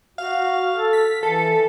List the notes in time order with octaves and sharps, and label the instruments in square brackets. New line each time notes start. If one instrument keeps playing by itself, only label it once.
[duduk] F#4 [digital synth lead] F5
[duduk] A4
[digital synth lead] B6
[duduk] E3 [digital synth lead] A4